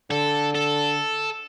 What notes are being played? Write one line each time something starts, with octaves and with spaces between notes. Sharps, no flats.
D3 A4
A4